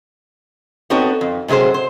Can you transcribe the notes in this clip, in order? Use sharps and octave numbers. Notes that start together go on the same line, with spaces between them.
B3 C4 D#4 F#4 A4 C#5
F2
G#2 C3 F#3 G#4 C5
C5